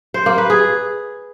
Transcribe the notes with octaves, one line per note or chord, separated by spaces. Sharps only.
C5
A#3
B4
G#4